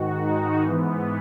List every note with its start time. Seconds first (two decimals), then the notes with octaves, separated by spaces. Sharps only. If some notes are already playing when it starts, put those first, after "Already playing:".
Already playing: G#2 D#3 F#4
0.20 D#4
0.62 G#2 E3 B3